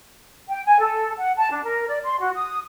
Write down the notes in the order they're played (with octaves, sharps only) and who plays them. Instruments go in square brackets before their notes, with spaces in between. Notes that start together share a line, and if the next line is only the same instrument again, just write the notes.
[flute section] G5
G#5
A4
F#5
A5
D4
A#4
D5
C6
F#4
D#6